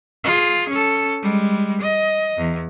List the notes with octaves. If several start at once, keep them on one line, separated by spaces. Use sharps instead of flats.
F4 G#4
C#4 A4
G3 G#3
D#5
E2